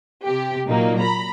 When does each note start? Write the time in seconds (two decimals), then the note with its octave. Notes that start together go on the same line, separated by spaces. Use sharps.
0.25 C3 G4
0.67 A#2 F#3 A#3 D#4
0.99 A#5 B5